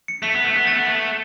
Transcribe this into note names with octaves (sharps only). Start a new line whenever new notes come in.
C#7
A3 B6
B3
A3
B3
A3 A6
B3
A3